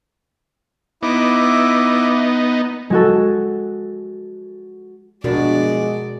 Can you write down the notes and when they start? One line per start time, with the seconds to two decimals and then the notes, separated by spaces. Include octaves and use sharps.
1.03 B3 D#4 E4 E5 D6
2.90 G#3 F#4 A4
5.24 G2 B2 F3 G#3 D4 F#4 A#4 D5